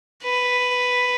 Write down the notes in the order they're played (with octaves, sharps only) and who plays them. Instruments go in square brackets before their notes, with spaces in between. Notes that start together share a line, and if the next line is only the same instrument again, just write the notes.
[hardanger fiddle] B4